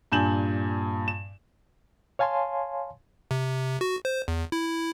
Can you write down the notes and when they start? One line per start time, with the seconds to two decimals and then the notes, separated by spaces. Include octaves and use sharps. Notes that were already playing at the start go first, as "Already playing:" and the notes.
0.12 G2 A#2 G#5 G6 E7 F#7
1.08 E7
2.19 C#5 F5 G#5 A5 C6
3.31 C3
3.81 F#4
4.05 C5
4.28 E2
4.52 E4